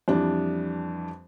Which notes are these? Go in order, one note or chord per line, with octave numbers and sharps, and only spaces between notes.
F2 E3 G3 D4